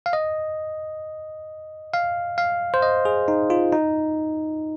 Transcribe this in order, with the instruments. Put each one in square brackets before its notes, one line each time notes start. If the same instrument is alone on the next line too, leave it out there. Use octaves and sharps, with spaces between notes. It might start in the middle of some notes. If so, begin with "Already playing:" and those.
[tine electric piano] F5
D#5
F5
F5
C5
D#5
G#4
D#4
F4
D#4